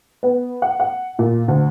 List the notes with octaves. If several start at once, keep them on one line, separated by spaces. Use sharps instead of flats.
B3
F#5
F#5
A#2
D2